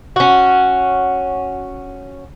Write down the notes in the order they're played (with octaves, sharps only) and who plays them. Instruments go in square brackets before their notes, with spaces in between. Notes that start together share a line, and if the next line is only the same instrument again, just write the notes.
[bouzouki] C#4 F#4